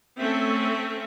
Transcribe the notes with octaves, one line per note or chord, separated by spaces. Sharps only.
A3 C4 C#4 E5